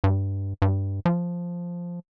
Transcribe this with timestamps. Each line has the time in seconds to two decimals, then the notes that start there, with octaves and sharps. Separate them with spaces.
0.04 G2
0.62 G2
1.05 F3